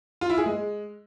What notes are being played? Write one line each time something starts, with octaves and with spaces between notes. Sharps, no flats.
F4
E4
G#4
G#3